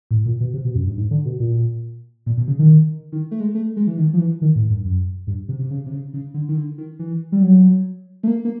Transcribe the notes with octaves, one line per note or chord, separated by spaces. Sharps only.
A2
A#2
B2
C3
B2
F#2
G2
G#2
D3
B2
A#2
A#2
B2
C#3
D#3
D#3
A3
G#3
A3
G#3
E3
D#3
F3
E3
D#3
A2
G2
F#2
G2
C3
C3
C#3
C3
C#3
C#3
D3
D#3
D3
D#3
E3
G3
F#3
A3
A#3
A#3